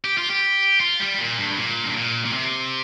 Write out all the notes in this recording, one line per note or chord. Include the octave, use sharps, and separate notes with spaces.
G4
F4
G4
F4
G3
A#2
G2
A#2
G2
A#2
A#2
C3